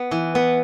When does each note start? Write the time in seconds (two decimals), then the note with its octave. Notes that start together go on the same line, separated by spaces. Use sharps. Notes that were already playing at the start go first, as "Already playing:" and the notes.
Already playing: B3
0.11 E3
0.35 B3